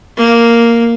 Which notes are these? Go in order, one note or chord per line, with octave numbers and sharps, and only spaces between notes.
A#3